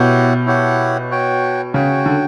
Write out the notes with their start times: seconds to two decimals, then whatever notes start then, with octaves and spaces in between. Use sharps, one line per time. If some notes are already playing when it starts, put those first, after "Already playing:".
Already playing: B2 E4 G4 C#5 F#5
0.46 E4 G4 C#5 F#5
1.11 F#4 C#5 G5
1.74 C#3 F#4 C#5 G5
2.06 D3